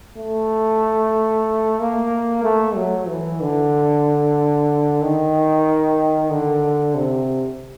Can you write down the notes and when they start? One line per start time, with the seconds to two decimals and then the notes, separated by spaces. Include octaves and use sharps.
0.18 A3
1.80 A#3
2.44 A3
2.76 F#3
3.08 E3
3.41 D3
5.02 D#3
6.31 D3
6.95 C3